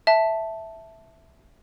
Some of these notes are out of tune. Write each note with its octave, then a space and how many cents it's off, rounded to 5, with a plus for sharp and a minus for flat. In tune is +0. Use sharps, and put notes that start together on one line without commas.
E5 -5 A5 +0